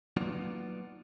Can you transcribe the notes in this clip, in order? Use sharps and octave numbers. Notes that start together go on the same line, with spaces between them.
F#3 A#3 B3 D4 D#4 F4